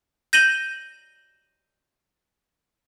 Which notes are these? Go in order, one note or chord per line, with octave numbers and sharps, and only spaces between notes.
G6 A#6 D#7 E7 F#7 G7